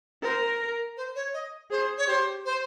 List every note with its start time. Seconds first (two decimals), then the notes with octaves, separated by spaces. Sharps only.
0.22 A#4 C5
0.97 C5
1.15 C#5
1.34 D#5
1.70 G#4 C5
1.98 C#5
2.08 G4 C5
2.45 C5